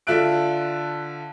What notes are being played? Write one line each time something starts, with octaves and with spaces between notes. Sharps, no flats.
D3 F4 E5 F#6 D7